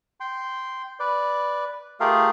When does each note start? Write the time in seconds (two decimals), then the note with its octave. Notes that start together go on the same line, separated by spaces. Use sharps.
0.20 G5 C6
1.00 B4 D5
2.00 A3 F4 G4 G#4 A#4 F5